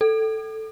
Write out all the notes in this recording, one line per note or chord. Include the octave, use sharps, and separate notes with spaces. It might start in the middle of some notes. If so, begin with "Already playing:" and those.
A4